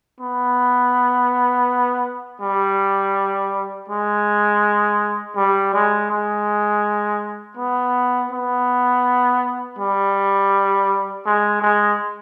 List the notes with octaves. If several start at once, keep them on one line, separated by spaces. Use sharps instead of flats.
B3
G3
G#3
G3
G#3
G#3
B3
B3
G3
G#3
G#3